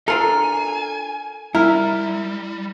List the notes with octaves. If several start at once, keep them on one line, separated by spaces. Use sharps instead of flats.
D4 F4 A4 A#4 G#5
G3 E4 A#4